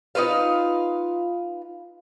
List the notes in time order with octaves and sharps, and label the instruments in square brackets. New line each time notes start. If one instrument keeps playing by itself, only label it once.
[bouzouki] D#4 F4 B4 F5